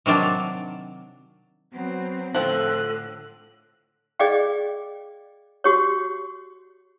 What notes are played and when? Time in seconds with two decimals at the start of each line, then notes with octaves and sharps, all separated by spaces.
0.06 C3 D#3 F#3 D4
1.72 F#3 B3 C4
2.34 A2 D3 F3 C4 A4 F#6
4.19 G#4 D5 D#5 F5 G5
5.64 F#4 G4 C#5